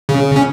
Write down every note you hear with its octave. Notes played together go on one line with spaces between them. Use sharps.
C#3
C#4